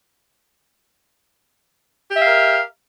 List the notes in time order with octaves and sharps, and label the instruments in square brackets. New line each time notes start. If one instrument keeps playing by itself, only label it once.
[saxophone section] G4
E5
F5
A#4